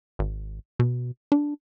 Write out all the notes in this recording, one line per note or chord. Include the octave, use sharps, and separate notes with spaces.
G#1
B2
D4